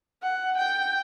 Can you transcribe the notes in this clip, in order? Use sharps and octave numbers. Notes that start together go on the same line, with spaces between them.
F#5
G5